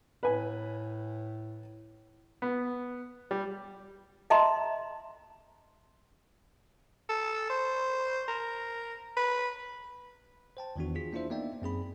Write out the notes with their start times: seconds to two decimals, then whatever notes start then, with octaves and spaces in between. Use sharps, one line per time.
0.23 A2 B4 G#5
2.42 B3
3.31 G3
4.30 D#5 E5 A5 A#5 C6
7.09 A4
7.50 C5
8.28 A#4
9.17 B4
10.57 C5 G5 A5
10.76 E2 D#3 E3 B3 D4 F#4
10.95 F4 G#4 B6
11.13 A#3 D4 E4 F4 C5 E5
11.30 A#3 B3 D#4 D5 E5 G5
11.62 F#2 C4 G#4 B5